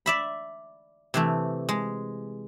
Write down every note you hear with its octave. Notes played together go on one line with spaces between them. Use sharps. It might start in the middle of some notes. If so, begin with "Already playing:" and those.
D5 E5 B5
C3 E3 A3
G#3